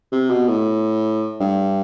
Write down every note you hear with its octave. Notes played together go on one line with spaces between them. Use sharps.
C3
B2
A2
G2